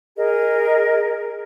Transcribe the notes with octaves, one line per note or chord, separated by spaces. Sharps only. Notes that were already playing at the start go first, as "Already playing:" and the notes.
G#4 A#4 D#5